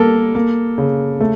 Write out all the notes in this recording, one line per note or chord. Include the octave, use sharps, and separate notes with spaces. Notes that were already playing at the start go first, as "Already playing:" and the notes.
Already playing: G3 A#3 A4 A#4
A#3
C#3
A3